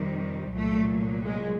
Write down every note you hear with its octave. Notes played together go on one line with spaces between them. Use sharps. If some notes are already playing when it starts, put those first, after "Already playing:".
Already playing: F2 C3 D#3 G3
C2 A#2 F#3 A3
G#3